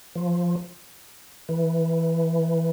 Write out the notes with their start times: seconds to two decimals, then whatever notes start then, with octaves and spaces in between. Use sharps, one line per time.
0.15 F3
1.49 E3